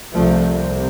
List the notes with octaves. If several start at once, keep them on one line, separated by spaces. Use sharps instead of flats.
C2 C3 F3 A3